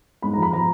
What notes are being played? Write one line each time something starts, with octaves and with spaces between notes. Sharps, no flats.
G#2 B5
F3 A#5
B5
F3 A#5